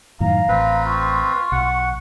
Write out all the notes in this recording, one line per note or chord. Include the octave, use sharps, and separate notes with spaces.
F#2 A2 D#3 F5 A#5
A1 C4 B4
F4 C#6
B1 F#5